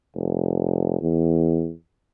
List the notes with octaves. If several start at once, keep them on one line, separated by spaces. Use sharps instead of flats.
F1
E2